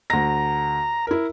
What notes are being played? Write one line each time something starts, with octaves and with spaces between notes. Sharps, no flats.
D2 A#5 A#6
E4 A#4